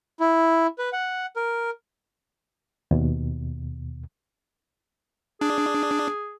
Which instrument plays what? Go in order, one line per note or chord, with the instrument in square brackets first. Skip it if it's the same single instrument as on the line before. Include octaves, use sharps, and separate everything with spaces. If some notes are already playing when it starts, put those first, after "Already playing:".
[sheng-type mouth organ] E4
B4
F#5
A#4
[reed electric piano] D#2 B2
[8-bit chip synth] D4 [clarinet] G#4